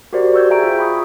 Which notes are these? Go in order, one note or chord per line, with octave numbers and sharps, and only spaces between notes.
F#4 G4 A#4 C5 D5
C#6 E6 G6 G#6
G#4 E5 G5 A#5 D7
F4
B5 C#6 D#6 G#6